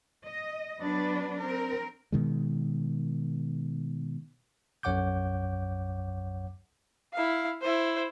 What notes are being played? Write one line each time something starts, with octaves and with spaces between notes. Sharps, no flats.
D#5
F#3 B3 D4 B4
C4 A#4
B2 D#3 G#3
B1 F#2 C#5 F#5 D6 G6
E4 F5
E4 C5